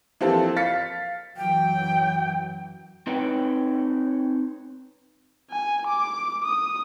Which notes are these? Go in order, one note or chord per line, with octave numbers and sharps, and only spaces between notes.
E3 F3 A#3 C4 G4 A4
F5 A6 B6 C#7
F#2 E3 F#3 G5
C4 D#4 B4 C#5 G5
G#5
D6
D#6